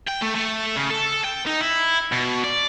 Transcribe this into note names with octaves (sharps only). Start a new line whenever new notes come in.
G5
A3
A3
C#3
A4
G5
D#4
E4
B2
D5